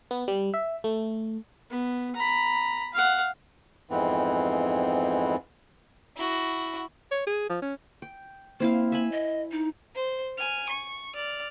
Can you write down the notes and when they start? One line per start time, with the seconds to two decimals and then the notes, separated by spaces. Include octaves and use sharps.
0.11 B3
0.28 G3
0.54 E5
0.84 A3
1.70 B3
2.16 A#5 B5
2.94 F5 F#5
3.90 F2 G#2 E3 B3 C4
6.17 E4 F#4
7.11 C#5
7.27 G#4
7.50 F3
7.62 C#4
8.02 G5
8.60 A#3 C4 E4 F5
8.92 E5 G#5 B5
9.12 D#5
9.52 D#4
9.95 C5
10.38 G#5 F6
10.69 C#6
11.15 D5 F6